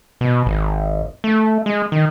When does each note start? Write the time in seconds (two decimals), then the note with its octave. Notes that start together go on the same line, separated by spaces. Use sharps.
0.21 B2
0.46 G#1
1.24 A3
1.66 G#3
1.92 D#3